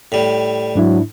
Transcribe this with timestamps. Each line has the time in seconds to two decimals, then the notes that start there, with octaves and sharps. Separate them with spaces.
0.12 A2 G3
0.75 G#2 F#3 D4 E4